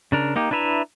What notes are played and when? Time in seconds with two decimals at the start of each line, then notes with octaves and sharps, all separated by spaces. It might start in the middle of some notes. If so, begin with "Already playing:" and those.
0.12 C#3 D4 A#4
0.36 A#3 D#4 G4
0.51 D4 E4 B4 E5 A#5